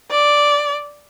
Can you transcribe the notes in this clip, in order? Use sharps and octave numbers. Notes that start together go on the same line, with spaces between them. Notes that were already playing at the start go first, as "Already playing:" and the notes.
D5